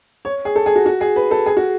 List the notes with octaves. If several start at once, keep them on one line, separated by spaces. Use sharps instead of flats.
C#5
G#4
A4
G#4
F#4
F#4
G#4
B4
A4
G#4
F#4